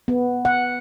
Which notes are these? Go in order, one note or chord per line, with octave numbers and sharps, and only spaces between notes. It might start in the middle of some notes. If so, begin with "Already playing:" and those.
B3
F#5